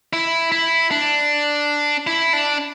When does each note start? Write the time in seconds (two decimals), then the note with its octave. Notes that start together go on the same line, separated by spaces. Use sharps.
0.13 E4
0.52 E4
0.91 D4
2.07 E4
2.33 D4